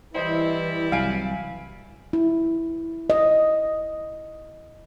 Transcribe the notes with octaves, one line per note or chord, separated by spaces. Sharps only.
E3 G3 E4 C5 D#5
C2 F#3 F5 G#5 D7
E4
D#5